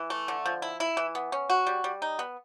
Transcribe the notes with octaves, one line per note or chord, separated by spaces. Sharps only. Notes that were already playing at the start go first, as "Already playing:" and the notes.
Already playing: E3
A3
D3
F3
E4
E4
E3
B3
C#4
F#4
G3
G3
D#4
B3